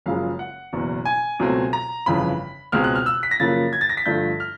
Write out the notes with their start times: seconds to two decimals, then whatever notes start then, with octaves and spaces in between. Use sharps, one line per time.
0.06 F#1 F#2 C#3 F3 G#3 F5
0.39 F#5
0.73 F#1 E2 B2
1.05 G#5
1.39 C#2 B2 F#3 A3 C4
1.73 A#5
2.06 G1 F2 C#3 E3 B5
2.72 C#2 B2 G#3 C4 F6
2.84 F#6
2.96 F6
3.06 E6
3.23 B6
3.31 A#6
3.40 F#2 C#3 F3 A#3 A6
3.73 G#6
3.81 A6
3.89 A#6
3.97 B6
4.06 G2 D3 F3 A3 G6
4.40 F6